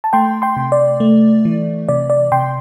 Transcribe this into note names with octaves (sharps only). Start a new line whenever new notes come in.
A5
A3 G5 C6
G5 C6
C3
D5
A3
E3
C3 D5
D5
C3 G5 C6